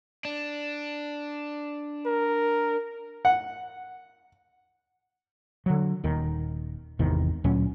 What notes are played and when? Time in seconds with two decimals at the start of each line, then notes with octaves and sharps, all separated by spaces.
0.25 D4
2.06 A#4
3.25 F#5
5.66 D3 F#3
6.04 D#1 D#2 D#3
6.99 G#1 E2 C3 D#3
7.44 D2 A#2 F#3 C#4